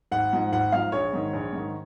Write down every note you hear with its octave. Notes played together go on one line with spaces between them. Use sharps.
G#1 F#5
G#2 F3
G#1 F#5
G#2 F3 F5
A#1 C#5
G#2 D#3
A#1
G#2 D#3